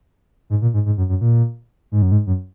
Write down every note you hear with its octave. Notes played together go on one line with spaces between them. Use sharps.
G#2
A#2
G#2
G#2
F#2
F#2
A#2
G#2
F#2
G#2
F#2